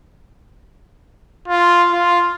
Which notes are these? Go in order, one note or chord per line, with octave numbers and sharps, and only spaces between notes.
F4
F4